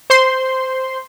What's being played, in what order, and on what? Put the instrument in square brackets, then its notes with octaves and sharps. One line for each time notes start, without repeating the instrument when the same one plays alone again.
[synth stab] C5 C6